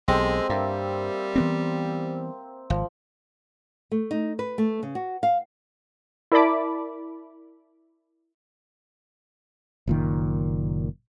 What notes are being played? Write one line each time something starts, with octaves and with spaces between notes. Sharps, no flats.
B1 G#3 C4 G4 A4
G2 G3 A#3 E5
E3 B3 C4
G#1 F3
A3
D#4
B4
A3
C#3
F#4
F5
E4 A#4 D5 A5 B5 D6
F#1 A#2 D#3